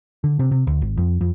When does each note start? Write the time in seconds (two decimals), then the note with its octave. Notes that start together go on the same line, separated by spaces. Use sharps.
0.24 D3
0.39 C3
0.51 C3
0.67 D2
0.82 G#1
0.97 F2
1.21 F2